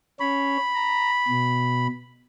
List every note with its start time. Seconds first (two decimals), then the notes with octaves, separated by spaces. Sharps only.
0.20 C#4 C#5 B5
0.74 A#5
1.28 B2